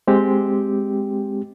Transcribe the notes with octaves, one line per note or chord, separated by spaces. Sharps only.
G#3 C4 G4